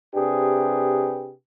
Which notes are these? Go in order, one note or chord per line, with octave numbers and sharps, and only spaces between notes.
C3 D4 G4 G#4 B4